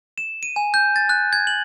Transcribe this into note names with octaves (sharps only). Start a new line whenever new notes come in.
E7
D#7
G#5
G6
A6
F#6
G#6
F#7